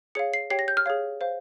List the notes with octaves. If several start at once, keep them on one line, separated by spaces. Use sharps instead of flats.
G#4 C#5 F5 C#7
C7
G4 C#5 G5 C7
A#6
G6
F6
G#4 C#5 F5
C5 F5